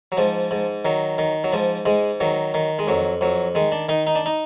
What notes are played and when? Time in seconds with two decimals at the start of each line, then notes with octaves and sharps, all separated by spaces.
0.12 F#3
0.17 G#2 F3
0.51 G#2
0.85 D#3 F#3
1.18 D#3
1.44 F#3
1.53 G#2 F3
1.86 G#2 G#3
2.20 D#3 F#3
2.54 D#3
2.79 G#3
2.87 F2 F#3
3.21 F2 F#3
3.55 D#3 G#3
3.72 D4
3.89 D#3 D#4
4.07 D#4
4.15 D4
4.26 D#4